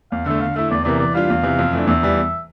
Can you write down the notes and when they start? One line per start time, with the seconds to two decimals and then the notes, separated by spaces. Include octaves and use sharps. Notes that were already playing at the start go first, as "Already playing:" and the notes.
0.11 E2 F5
0.26 D3 A3 E5
0.41 D3 F5
0.56 A3 E4 E5
0.71 E2 D5
0.85 C3 E3 A#3 D5
0.99 E3 D5
1.14 G3 D4 F4 F5
1.30 E2
1.43 C3 E3
1.59 F2
1.73 E3 A3 D4
1.87 E2 E5
2.03 E3 G3